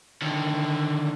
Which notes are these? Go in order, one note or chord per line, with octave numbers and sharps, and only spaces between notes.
D3 D#3